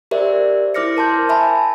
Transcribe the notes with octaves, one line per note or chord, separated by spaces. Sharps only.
G4 A#4 C5 D5 E5
E4 C5 D6 F6 A#6 C#7
A#4 A5 C6 G6
E5 G#5 A5 B5